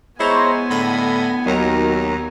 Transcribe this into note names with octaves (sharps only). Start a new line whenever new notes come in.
G#3 B3 E4 C5 C#5 G#5 A#5
A2 D3 B5 A#6 D#7
D#2 D#3 F#3 A#5